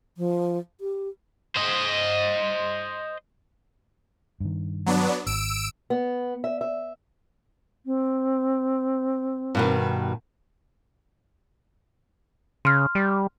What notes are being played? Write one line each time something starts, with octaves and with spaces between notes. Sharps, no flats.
F3
G4
C5 D#5
G2 D#3
F#3 B3 D4
G#1 E6 D7
B3
E5
E5
C4
G2 B2 D#3
C#3 C6 F6
G3